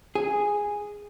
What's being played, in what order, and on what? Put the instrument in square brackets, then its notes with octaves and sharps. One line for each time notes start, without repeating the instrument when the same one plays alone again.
[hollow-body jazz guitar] G#4